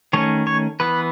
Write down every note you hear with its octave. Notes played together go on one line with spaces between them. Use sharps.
D#3 A3 C#4 C#5
C#5
E3 B3 B4